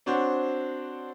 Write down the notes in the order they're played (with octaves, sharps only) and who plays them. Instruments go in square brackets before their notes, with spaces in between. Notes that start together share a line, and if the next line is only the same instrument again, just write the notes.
[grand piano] C4 D4 F#4 C5 C#5